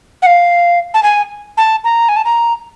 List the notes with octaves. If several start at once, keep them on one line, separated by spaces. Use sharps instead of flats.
F#5
F5
A5
G#5
A5
A#5
G#5
A5
A#5